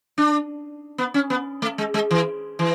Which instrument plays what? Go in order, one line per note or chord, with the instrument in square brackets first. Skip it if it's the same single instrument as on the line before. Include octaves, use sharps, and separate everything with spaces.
[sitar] D4
B3
C#4
B3
A3
G#3
G#3
E3
E3